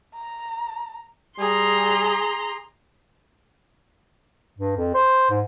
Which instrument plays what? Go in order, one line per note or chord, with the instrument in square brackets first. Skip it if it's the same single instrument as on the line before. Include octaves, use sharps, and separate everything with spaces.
[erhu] A#5
[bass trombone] G3 [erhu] G#4 [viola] A#5 C6
[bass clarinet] G2
F2
C5
G#2